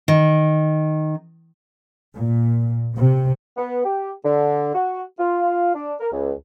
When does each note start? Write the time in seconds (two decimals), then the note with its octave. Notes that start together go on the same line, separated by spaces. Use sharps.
0.08 D#3
2.16 A#2
2.97 C3
3.57 B3
3.84 G4
4.25 D3
4.75 F#4
5.19 F4
5.74 D4
6.00 A#4
6.12 C#2